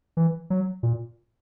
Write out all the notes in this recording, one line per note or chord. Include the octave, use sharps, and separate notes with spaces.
E3
F#3
A#2